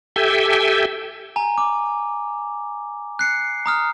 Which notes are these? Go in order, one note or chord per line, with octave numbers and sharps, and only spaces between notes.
G4 A4 E5 G5 G#5
G#5 A#5
D6
F#6 C7 C#7
A#5 D#6 F6